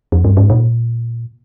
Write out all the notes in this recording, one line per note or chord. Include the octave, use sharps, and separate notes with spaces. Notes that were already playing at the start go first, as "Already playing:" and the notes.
F2
G2
G#2
A#2